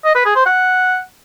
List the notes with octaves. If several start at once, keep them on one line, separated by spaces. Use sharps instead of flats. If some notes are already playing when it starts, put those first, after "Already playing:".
D#5
B4
G#4
C5
F#5